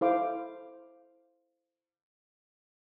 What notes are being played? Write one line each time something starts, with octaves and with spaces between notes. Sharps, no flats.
E4 A4 C5 F5 D6